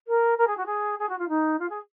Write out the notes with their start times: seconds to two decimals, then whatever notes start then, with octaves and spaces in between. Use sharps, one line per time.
0.08 A#4
0.38 A#4
0.47 G#4
0.57 F#4
0.66 G#4
0.99 G#4
1.09 F#4
1.19 F4
1.29 D#4
1.59 F4
1.70 G#4